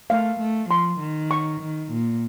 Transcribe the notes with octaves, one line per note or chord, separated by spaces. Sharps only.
A3 F5
A3
F3 C6
D#3
C#6
D#3
A#2